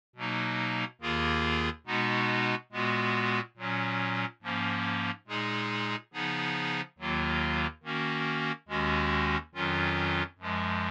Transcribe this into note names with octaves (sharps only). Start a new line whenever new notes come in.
B2 F#3 A#3 D#4
D#2 D#3 A#3 F4 G#4
B2 G#3 B3 D#4 F#4
A#2 G#3 B3 F#4
A#2 F#3 C#4
G#2 F3 A#3 C#4
A#2 G#3 D#4 G#4
C#3 F3 B3 D#4 G#4
D#2 D#3 F#3 A#3 F4
D#3 A#3 C#4 F#4
D#2 D#3 G#3 C#4 F#4
F2 D#3 F#3 C#4 F4
F#2 F3 G#3